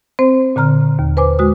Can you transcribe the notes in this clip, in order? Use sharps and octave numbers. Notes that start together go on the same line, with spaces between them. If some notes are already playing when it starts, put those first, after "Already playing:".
C4 C5
A#2 D3 A#5 F6
D#2
B4 C5 G#5 D6
G#3 F#4 D#6